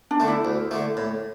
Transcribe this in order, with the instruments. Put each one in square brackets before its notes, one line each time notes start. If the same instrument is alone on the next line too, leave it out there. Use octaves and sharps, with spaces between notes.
[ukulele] D4
[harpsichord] D3 A3
[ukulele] E4
[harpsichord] D2
D3 A3
A2